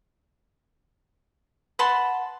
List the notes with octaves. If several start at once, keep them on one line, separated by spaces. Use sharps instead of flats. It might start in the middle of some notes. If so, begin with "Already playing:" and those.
B4 F#5 A5 C6